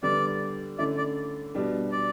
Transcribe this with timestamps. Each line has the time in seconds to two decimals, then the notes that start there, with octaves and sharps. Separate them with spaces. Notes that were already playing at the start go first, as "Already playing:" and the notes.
0.03 D3 G3 B3 D5
0.78 D3 A3 C#4 E4 D5
0.97 D5
1.55 B2 G3 D4
1.92 D5